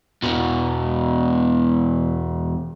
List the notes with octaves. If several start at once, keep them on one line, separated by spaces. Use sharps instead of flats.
E2 B2